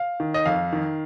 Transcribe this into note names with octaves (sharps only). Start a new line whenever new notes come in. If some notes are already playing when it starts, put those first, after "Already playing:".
Already playing: F5
D#3
D#5
F2 F5
D#3